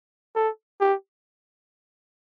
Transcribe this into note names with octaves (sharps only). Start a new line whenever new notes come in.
A4
G4